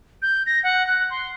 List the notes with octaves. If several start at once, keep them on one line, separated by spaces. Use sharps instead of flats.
G6
A#6
F#5
F#6
C6